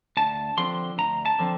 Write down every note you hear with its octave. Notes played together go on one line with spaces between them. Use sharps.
D2 A5
D3 F3 C4 C6
D2 A#5
A5
D3 F3 C4